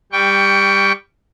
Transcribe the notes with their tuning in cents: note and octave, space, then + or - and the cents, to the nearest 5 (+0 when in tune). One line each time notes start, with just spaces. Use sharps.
G3 +15 G5 +0 C#6 +30